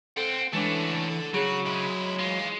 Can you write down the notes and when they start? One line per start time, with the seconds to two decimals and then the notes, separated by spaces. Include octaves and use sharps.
0.17 C4 A4 F#5 G5
0.53 E3 G#3 A3 C#4 D4 A4 F#5
1.34 C#3 F#3 F#4 G#4 C#6
1.66 G#3 E4
2.19 E3 G#3 F4